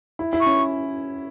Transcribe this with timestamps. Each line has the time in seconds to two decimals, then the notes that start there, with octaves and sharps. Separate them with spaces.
0.19 E4
0.33 E4
0.40 C#6
0.46 C#4